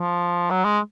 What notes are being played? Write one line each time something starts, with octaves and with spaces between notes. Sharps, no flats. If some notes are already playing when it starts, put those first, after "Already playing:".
Already playing: F3
F#3
G#3